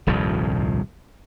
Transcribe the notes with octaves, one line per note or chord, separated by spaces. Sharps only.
D#1 C2 G2 F3